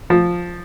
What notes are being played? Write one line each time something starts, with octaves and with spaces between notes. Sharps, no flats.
F3